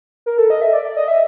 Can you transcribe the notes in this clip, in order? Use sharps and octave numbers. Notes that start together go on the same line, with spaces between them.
A#4
A4
D#5
E5
D5
D5
D#5
E5